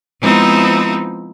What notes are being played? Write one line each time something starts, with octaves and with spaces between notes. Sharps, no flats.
F3 G#3 B3 C4 D#4 E4